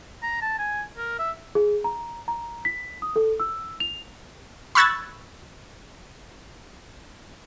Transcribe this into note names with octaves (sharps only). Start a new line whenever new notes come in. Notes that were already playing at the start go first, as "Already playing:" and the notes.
A#5
A5
G#5
A#4
E5
G#4
A#5
A#5
B6
D#6
A4
E6
F7
B5 C#6 E6 F#6 G#6 A6